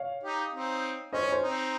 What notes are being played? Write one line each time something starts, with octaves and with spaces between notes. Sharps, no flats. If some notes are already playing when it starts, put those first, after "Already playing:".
Already playing: C#5 F5
D#4 G4
C4 D#4
C#4 C5 D#5
C#5
C5
C4 D#4